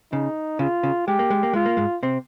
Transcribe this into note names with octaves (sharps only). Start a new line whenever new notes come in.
C#3 D#4
C#3 F4
C#3
G#3 G4
A#3
G#3
A#3
G#3 F4
A#3
G#2 G#3
C3 C4